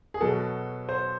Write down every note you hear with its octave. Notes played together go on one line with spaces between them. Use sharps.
G#4
B2 F#3 A4
C5